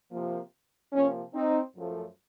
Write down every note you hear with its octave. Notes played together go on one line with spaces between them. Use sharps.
C3 F3 A#3
C3 F3 A#3 C#4
C4 D#4
F#2 F3 A3